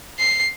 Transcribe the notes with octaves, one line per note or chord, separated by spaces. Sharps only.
C7